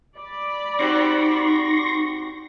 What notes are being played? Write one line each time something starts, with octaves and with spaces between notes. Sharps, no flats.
D5 B5
C4 D#4 F#4 G4 C6 C#6 A#6